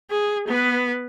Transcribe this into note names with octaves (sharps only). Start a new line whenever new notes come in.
G#4
B3 B4